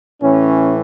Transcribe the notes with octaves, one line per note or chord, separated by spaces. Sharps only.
A2 E3 C#4